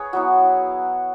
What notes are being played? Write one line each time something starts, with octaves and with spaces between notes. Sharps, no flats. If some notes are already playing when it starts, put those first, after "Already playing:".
Already playing: G#4 B4 C#5
F#3 B3 E4 F#4